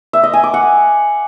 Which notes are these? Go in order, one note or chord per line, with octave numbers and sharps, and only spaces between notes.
E5
D#5
G#5
D6
F#5